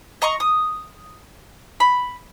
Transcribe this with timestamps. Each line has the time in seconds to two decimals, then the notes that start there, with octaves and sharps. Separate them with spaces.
0.22 D#5 A#5 C6 C#6
0.40 D#6
1.80 B5